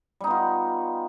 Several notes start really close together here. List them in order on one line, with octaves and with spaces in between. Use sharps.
G3 D#4 B3 F4